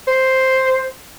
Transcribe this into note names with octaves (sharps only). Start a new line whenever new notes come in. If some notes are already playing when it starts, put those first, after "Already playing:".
C5